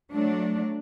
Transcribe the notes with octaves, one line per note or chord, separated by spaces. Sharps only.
F#3 A3 D4